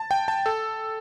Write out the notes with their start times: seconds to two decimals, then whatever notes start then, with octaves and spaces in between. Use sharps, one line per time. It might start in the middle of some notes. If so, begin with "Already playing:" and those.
Already playing: A5
0.11 G5
0.28 A5
0.46 A4